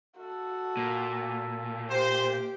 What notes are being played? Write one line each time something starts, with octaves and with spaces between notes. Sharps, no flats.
F#4 A4
A#2
G4 C5